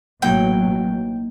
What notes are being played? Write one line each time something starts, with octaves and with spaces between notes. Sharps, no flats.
A1 B2 F#3 A#3 D#4 E4 G5